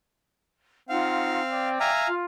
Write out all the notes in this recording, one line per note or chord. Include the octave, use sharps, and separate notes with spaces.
C4 D#4 F4 F5 F#5
D5 G5 D6
E5 F5 G#5 A#5
F4